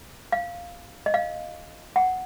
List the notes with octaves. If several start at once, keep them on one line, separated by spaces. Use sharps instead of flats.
F5
D#5
F5
F#5